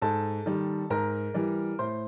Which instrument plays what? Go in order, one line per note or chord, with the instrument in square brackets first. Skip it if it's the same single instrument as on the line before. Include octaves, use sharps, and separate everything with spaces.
[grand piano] G#2 A4 A5
D#3 G3
G#2 A#4 A#5
E3 G3
A2 C5 C6